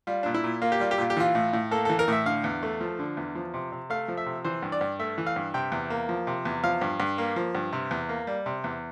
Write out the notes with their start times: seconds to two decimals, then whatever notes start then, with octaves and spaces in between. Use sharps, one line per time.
0.07 G3 F4
0.23 A#2 D4
0.34 E4
0.44 A#2
0.62 A#3 F4
0.72 G4
0.80 G3 F4
0.91 G4
0.98 A#2 F4
1.10 G4
1.17 E3 F4
1.35 A2
1.53 A2
1.71 A#3 A4
1.85 E3 A4
1.99 A#4
2.08 A2 E5
2.26 D3 F5
2.44 E2
2.63 A3
2.81 F3
2.99 D3
3.17 E2
3.35 F3
3.54 C3
3.72 C3
3.90 A3 F5
4.08 F3
4.17 E5
4.26 C3
4.44 E3 C5
4.63 G2
4.72 D5
4.81 G2
4.99 A3 E5
5.18 E3
5.27 F5
5.36 G2
5.54 C3 G5
5.72 E2
5.90 A#3
6.09 F3
6.27 C3
6.45 E2
6.63 F3 F5
6.81 G2
7.00 G2
7.18 A#3
7.36 F3
7.55 G2
7.73 C3
7.91 E2
8.09 A#3
8.27 G3
8.46 C3
8.64 E2